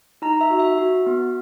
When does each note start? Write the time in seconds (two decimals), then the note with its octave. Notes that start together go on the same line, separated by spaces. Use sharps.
0.22 D#4 A#5
0.41 E5
0.50 F#4
0.60 E5
0.78 F#4
1.06 B3